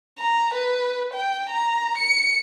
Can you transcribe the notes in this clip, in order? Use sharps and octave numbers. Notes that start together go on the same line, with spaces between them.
A#5
B4
G5
A#5
C#7